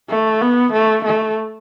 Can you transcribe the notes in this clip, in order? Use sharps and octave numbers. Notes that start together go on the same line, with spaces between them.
A3
B3
A3
A3